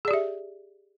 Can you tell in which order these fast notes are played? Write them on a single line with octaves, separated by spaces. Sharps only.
G#4 D5 G4 E5